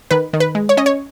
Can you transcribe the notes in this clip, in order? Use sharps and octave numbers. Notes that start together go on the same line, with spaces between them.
D#3 B4
D#3
B4
G#3
C#5
C#4 D#5
C#5